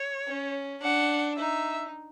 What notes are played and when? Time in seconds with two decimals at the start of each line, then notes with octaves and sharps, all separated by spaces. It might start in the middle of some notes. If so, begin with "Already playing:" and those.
Already playing: C#5
0.27 C#4
0.82 D4 F#5
1.38 D#4 E5